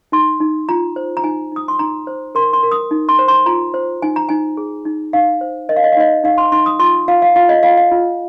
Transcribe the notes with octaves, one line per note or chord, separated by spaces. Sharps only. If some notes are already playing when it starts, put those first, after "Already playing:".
D#4 C6
D#4
F4 A#5
C5
A#5
D#4 G#5
D#4 D#6
C6
D#4 A#5
C5
A#4 C6
C6
A#4
D#6
D#4
C6
C5
C6
F4 A#5
C5
D#4 G#5
A#5
D#4 G#5
G#4
D#4
D#4 F5
C5
A#4 D#5
F5
D#5
F5
D#4 D#5
D#4 F5
C6
D#4 C6
D#6
F4 C6
F4 F5
F5
F4 F5
D#5
F4 F5
F5
F4